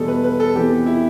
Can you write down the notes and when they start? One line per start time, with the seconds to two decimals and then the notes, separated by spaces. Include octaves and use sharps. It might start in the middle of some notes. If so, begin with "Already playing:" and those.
Already playing: E2 B2 G3 B3 A4
0.08 B4
0.24 B4
0.40 A4
0.55 E2 C3 E3 B3 G4
0.86 E4